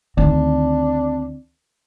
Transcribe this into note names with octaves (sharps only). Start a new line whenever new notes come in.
D2 D#3 C4 D4